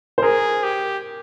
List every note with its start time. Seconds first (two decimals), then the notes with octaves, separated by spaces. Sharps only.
0.18 C5
0.22 G#4 A#4
0.64 G4